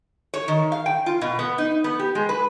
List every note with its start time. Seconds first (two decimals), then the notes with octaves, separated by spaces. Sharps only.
0.34 C#5
0.48 D#3
0.72 F5
0.86 G5
1.06 F4
1.21 B2
1.39 B3
1.58 D#4
1.84 B3
1.99 G4
2.15 G#3
2.29 B4